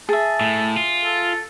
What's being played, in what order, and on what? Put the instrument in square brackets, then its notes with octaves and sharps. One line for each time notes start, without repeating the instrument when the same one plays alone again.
[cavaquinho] G#4 E5 [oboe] A5
[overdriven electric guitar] A2
F4
[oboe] A4